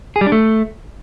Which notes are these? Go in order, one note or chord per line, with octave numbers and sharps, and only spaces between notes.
G#4
G3
D4
A3